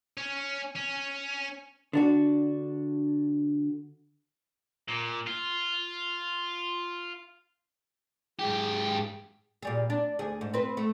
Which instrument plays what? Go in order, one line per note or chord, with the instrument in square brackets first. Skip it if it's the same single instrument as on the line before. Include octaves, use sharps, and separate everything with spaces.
[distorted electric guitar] C#4
C#4
[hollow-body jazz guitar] D3 D4 F#4
[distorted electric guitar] A#2
F4
[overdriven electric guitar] G#2 G4 [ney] G#4
[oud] A#2 G3 G#4
D4
D2 G#4
G#2
C4 B4
A3